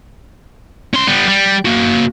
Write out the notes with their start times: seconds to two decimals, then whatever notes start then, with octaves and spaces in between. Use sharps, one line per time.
0.94 C#4 C6
1.07 G3 B3
1.28 G3
1.65 A#3 F#4